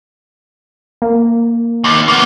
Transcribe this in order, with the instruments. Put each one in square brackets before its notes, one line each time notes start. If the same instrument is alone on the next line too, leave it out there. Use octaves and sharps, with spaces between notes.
[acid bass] A#3
[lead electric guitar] D#2
A#3 B3